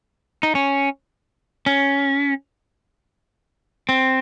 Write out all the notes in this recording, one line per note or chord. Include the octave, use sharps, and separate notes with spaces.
D#4
C#4
C#4
C4